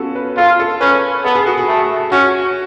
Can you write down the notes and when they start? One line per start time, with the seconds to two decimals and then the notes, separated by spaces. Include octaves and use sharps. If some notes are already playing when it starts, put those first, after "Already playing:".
Already playing: B3 C#4 F4 F#4 A4
0.15 B4
0.37 F4 A4
0.59 A4
0.81 C#4 B4
1.24 B3 A4
1.35 G#4
1.47 F#4
1.57 G#4
1.68 A3
2.11 C#4 F#4